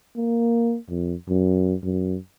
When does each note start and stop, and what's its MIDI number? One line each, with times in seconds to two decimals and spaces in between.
0.16 0.77 58
0.89 1.14 41
1.28 1.75 42
1.83 2.17 42